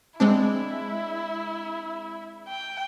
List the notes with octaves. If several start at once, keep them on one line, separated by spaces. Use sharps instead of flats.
G#3 C4 D4 E4
G5